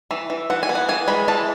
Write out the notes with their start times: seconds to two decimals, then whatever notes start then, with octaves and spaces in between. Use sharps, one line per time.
0.11 E3 E5
0.30 E3
0.50 E3 F#5
0.63 G#5
0.69 B3
0.75 F#5
0.89 E3 G#5
1.08 G#3 B5
1.28 E3 A5